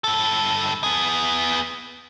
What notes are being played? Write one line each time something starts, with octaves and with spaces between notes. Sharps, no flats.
G2 A4
B3 G#4